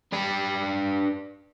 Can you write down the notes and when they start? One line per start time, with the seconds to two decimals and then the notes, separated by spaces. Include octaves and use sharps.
0.13 D4 B4